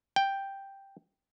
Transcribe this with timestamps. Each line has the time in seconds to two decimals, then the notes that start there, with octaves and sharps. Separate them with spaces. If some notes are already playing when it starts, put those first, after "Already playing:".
0.16 G5